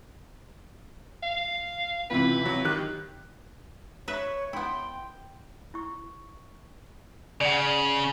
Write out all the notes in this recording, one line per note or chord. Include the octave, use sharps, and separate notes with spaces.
F5
C#2 C3 E3 B4
F#3
D#3 G4 F#6
B4 C#5 E5
B3 E4 G5 C6
E4 C#6
C#3 D5 F#5